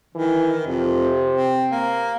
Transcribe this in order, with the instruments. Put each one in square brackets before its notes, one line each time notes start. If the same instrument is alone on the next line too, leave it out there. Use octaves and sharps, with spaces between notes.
[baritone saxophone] D#3 [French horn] E3
[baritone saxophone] F2 [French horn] C3
[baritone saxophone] C4
A#3